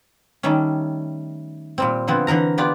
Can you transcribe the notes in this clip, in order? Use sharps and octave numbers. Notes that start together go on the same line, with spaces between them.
D#3 G3 A3 C#4
A#2 G3 C4
D3 F3 B3 C4
D3 E3 A#4 A#5
B3 F4 G4 D5